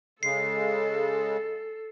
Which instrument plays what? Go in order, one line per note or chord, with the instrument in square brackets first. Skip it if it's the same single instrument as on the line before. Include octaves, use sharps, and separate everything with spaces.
[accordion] C#3 G#3 [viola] A4 [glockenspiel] C7